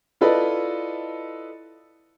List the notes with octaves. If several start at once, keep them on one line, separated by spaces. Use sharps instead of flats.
E4 F4 A4 B4 D5 D#5